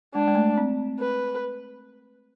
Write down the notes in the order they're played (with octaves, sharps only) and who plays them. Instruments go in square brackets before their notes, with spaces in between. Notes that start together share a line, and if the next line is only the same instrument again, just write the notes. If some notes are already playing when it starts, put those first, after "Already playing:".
[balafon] G#3 [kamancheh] D4
[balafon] G#3
A3
C4
[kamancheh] B4